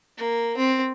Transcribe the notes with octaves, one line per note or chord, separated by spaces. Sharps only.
A#3
C4